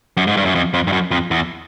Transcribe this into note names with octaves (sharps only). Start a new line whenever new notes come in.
F#2
G#2
G2
F#2
F2
F2
G2
F#2
F2
E2